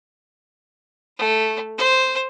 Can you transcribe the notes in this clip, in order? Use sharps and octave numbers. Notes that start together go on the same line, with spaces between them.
A3
C5